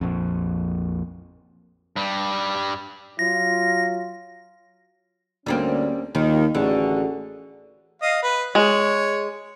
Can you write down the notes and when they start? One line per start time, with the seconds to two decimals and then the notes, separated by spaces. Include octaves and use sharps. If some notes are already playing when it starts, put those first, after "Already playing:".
0.01 A#1 F2
1.96 G2 G3
3.19 F#3 F4 A#6
5.46 D2 G3 A#3 C4 C#4
6.15 D#2 D#3 F4 G4
6.55 A1 D3 E3 F#4 G#4
8.02 D#5 F5
8.23 B4
8.55 G#3 C#5